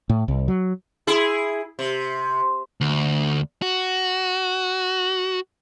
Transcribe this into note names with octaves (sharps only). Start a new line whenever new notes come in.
A2
C2
F#3
E4 G#4
C3
D2
F#4